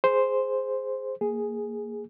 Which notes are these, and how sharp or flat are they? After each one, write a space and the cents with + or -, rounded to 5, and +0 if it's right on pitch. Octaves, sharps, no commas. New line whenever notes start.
G#4 +0 C5 +0
A#3 -10 G#4 +0